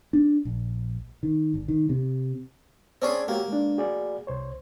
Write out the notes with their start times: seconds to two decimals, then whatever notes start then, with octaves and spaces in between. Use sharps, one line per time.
0.13 D4
0.45 A#1
1.23 D#3
1.54 G#1
1.68 D#3
1.89 C3
3.02 C4 C#4 G#4 C5 D5 A5
3.28 A#3 F#4 G4 C#5
3.48 G#3 D4
3.78 F#4 G#4 D5
4.27 C2 C5 C#5